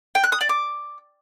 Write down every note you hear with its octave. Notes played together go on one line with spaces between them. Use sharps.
G5
F#6
D#6
D5
D6